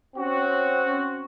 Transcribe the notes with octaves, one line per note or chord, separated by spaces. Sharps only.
C4 C#4 F#4